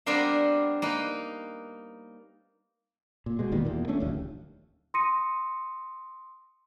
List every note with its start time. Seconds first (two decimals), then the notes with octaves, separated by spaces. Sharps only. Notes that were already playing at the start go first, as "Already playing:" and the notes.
0.06 G3 B3 C4 D4 A#4 F5
0.82 A#3 D#4 B4
3.26 A#2
3.39 B2 G#3
3.52 E1 A#2 D#3 G3
3.65 E2 A#2
3.88 A3 C#4 D4
4.00 D1 A#1 D#2
4.94 C6 D#6 A#6 C#7 D#7